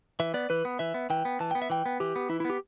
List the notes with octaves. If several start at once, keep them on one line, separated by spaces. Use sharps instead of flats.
E3 E5
B3 D5
E3 B4
B3
E3 E5
B3
E3 G5
B3
E3 A5
B3 G5
E5
E3 G5
B3
E3 G4
B3
E3 E4
E4
B3
G4